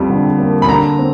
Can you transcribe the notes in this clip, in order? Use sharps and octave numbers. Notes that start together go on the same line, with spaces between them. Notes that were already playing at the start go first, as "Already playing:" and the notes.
Already playing: F2 G3
D3
A#3
B5
D3 A#5
C4